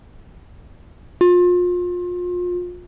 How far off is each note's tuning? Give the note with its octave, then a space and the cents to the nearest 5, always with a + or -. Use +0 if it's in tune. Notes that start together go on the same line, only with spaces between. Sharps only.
F4 +30